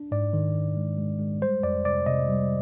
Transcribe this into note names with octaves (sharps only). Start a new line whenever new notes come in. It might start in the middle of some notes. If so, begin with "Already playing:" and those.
Already playing: D4
G#2 D5
D#3
D#3
G#3
G#3
G#3
G3 C5
F2 D5
C3 D5
C3 D#5
G3